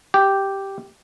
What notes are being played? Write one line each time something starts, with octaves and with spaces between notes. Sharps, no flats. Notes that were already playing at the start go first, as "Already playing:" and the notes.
G4